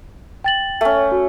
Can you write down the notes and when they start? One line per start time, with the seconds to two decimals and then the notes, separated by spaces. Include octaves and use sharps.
0.44 G5 A6 F#7
0.81 A3 C#4
1.12 F#4